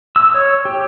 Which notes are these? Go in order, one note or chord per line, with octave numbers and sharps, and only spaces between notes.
E6
C#5
G4